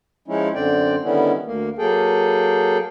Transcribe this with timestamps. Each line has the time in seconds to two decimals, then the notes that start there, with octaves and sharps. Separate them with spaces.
0.28 F3 G#3 C#4 D#4 E4
0.54 F#2 D3 C4 D5 G5
1.03 D3 D#3 G3 B3 C#4 E4
1.46 D2 A#3
1.78 F#3 A#3 G#4 A4 G5